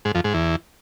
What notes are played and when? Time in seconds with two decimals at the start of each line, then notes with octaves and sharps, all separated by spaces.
0.05 G#2
0.15 F2
0.24 G#2
0.34 E2